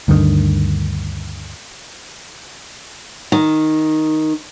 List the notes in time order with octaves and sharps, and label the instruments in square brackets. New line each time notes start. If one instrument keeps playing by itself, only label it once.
[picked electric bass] D2 G2 D3 D#3
[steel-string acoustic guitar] D#3